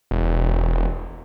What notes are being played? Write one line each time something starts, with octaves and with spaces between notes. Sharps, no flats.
E1